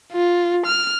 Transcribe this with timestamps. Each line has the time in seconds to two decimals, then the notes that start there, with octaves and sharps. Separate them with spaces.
0.13 F4
0.66 F6